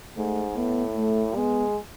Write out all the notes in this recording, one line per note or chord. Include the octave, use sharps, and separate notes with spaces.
G#2 A3
A2 B3
A3
G#3 B3